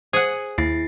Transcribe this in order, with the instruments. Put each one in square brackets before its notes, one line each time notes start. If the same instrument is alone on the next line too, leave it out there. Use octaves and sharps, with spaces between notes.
[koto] G#4 F#5 [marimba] C5
[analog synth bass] D#2 [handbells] E4 A6 C7